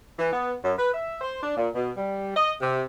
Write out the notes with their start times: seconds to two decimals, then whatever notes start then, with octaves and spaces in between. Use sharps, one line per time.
0.19 E3
0.33 B3
0.64 F#2
0.78 B4
0.94 E5
1.21 C5
1.43 D4
1.56 A#2
1.75 B2
1.97 G3
2.36 D#5
2.61 C3